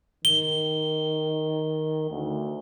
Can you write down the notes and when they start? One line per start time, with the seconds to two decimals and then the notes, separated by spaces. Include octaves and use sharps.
0.25 D#3 G7
2.11 D2